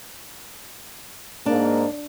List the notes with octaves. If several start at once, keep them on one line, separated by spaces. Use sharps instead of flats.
G#2 A#3 D4